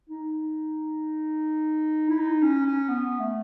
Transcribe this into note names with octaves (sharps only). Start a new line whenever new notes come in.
D#4
E4
D#4
C#4
C#4
B3
A3